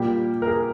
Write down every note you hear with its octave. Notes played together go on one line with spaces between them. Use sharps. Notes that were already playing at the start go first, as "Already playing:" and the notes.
Already playing: A#2 G3 A#3 G4
A#4
G#4